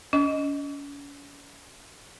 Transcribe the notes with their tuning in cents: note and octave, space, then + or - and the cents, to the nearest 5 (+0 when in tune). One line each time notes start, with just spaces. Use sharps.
C#4 +40 D#5 +0